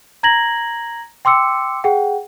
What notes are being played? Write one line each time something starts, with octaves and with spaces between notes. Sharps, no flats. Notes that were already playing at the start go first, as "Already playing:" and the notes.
A#5 G#6 A#6 F#7
G5 C6 D6 E6 C#7
G#4 F#5 G5